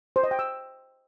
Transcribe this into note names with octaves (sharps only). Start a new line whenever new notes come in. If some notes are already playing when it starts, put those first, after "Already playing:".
C5
D#5
G5
E6